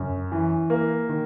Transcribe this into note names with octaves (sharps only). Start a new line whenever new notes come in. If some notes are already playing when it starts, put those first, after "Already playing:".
Already playing: F#2
E3
A#3
D#3